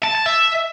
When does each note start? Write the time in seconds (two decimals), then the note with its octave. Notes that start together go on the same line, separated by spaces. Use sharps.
0.03 A5
0.15 A5
0.26 E5